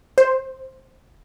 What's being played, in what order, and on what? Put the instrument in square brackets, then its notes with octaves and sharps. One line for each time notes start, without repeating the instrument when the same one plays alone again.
[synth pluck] C5